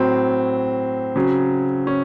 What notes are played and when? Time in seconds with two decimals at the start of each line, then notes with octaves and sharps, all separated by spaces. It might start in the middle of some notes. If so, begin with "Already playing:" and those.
Already playing: A2 F#3 C4
1.16 C#3 F#3
1.87 C#4